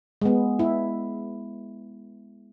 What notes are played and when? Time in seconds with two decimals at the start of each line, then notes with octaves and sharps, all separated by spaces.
0.22 G#3 B3
0.59 E4